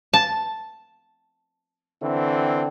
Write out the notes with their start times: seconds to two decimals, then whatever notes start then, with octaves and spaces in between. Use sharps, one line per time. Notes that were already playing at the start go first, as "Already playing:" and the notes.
0.14 A5
2.02 D3 E3 C4